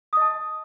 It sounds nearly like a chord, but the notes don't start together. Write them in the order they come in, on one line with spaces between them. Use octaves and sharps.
D#6 D#5 A5